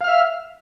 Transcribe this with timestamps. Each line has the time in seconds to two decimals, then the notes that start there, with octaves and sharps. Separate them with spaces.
0.01 F5
0.04 F6
0.08 E5